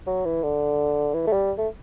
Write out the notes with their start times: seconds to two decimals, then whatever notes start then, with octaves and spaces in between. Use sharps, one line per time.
0.07 F#3
0.25 E3
0.43 D3
1.14 E3
1.27 A3
1.33 G3
1.58 A3